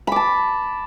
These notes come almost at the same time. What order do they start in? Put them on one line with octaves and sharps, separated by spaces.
B5 D6 A5